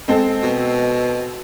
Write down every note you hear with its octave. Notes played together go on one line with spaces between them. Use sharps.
G#3 C4 A4
B2